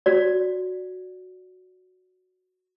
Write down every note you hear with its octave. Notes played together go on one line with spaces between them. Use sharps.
F#4 D5